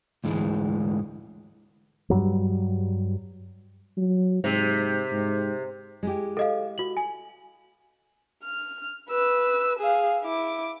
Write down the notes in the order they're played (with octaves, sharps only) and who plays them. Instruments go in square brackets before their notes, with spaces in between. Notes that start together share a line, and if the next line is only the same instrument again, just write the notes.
[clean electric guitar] D2 G#2 E3 G#3
[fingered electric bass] G2 F#3 G3
[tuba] F#3
[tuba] G#2 [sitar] C3
[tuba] G#2
[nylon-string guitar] G#3 E4 G4
[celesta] A4 D#5 F5
F#4 F#7
G#5
[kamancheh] F6
B4 E6
G#4 F5
E4 D6